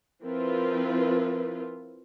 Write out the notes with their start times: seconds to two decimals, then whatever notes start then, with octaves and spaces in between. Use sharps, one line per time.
0.23 F3 C4 E4 F4 A#4 B4